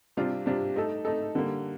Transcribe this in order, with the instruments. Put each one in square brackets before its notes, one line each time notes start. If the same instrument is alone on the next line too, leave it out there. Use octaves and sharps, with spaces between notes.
[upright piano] C3 G3 D4 F4
C3 G3 D4 F4
A3 D#4 A4
A3 D#4 A4
D3 G3 A#3